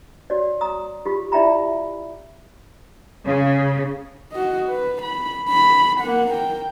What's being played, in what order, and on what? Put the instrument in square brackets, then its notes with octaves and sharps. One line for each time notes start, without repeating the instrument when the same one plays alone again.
[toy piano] F#4 C#5 D5
A#5 D#6
F4 G4
E4 D5 E5 G5 A#5 B5
[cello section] C#3
[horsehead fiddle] F#4 D#5
B4
B5
B5
A#3 F#5
A#4 G5